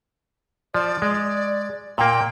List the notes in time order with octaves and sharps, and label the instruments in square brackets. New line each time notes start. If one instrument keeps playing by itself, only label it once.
[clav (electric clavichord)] F3 [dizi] D5
[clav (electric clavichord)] G#3
[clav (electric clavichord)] A#2 A#3 [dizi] G5